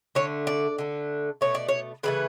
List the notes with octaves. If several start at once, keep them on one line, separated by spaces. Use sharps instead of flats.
D3 A3 C#5
D5
D3 A3
B2 A3 C#5
D5
C#5
C#3 E3 A3 B4